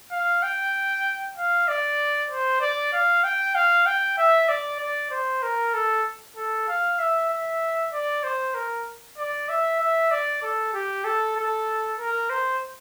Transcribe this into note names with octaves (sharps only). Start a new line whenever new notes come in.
F5
G5
F5
D5
C5
D5
F5
G5
F5
G5
E5
D5
D5
C5
A#4
A4
A4
F5
E5
E5
D5
C5
A#4
D5
E5
E5
D5
A4
G4
A4
A4
A#4
C5